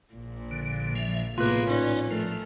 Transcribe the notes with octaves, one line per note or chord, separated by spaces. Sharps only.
A#1 A#2
D3
F3 E5
A2 C3 A#3 B3 F4 G#4 B4
C#4 D#4 D5
F3 A3 A#4